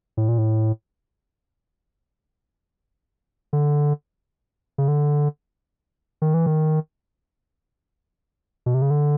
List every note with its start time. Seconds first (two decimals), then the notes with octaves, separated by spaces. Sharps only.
0.17 A2
0.28 A#2
0.38 A2
3.53 D3
4.78 C#3
4.88 D3
6.22 D#3
6.34 E3
6.46 D#3
8.66 B2
8.74 C3
8.82 C#3
8.91 D3